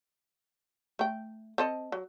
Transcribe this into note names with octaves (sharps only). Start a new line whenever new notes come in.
A3 G5
C4 A4 D#5
F#3